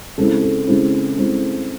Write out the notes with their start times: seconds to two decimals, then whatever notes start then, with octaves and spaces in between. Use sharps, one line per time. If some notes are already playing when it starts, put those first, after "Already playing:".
0.18 C#3 G#3 C4 E4 A4
0.42 A4
0.67 C#3 G#3 C4 E4
1.16 C#3 G#3 C4 E4